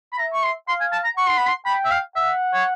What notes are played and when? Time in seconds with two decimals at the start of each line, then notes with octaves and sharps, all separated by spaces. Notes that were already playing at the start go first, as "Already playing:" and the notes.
0.12 B5
0.18 E5 A#5
0.33 C#6
0.44 C6
0.68 F5 C6
0.80 G#5
0.92 A5
1.04 A#5
1.17 F#5 C#6
1.27 C6
1.37 B5
1.47 C6
1.65 G5 B5
1.85 E5
1.91 F5
2.16 E5 F#5
2.54 C#5